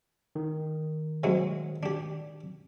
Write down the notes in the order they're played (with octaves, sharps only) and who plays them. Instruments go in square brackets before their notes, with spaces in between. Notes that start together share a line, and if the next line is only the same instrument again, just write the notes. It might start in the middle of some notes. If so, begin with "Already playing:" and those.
[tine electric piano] D#3
[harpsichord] C3 F#3 G#3
D4 G4